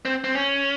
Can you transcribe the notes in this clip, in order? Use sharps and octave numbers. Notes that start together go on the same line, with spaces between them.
C4
C4
C#4